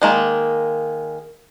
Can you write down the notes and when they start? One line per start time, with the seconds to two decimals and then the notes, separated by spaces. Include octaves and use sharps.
0.02 D#3 G#3 A#3